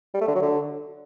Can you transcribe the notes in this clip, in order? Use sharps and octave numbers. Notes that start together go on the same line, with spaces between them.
G3
A3
D3
F#3
D3